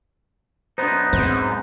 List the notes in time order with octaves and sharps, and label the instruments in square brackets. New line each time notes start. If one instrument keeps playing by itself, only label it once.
[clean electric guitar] F#2 B3 D#4 [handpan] D4 C5
[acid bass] G#2 [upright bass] C4 [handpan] C5